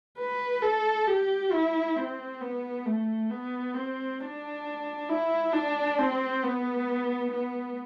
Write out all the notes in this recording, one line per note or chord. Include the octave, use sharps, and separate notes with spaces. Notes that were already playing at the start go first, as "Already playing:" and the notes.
B4
A4
G4
E4
C4
B3
A3
B3
C4
D4
E4
D4
C4
B3
B3